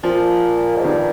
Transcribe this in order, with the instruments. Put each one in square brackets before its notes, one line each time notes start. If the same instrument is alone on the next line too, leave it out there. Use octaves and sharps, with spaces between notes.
[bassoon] A#2 [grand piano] F3
[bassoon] G#2
[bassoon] G2 [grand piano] D#3